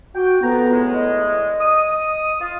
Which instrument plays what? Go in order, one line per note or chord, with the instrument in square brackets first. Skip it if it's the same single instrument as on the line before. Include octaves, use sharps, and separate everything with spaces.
[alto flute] F#4 [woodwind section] G5
[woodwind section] F2 A#5 [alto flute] B3
[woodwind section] E2 A2 G#3
[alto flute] D#5
[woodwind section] D#6
F4